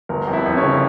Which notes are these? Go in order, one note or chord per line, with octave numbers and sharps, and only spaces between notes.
G1 A#4
F2
E4
F2
C#4
C#3